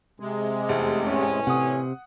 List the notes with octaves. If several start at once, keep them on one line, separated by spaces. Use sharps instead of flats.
C3 G#3
F1 E2 A3
A1 C#4
C3 F#5 D#6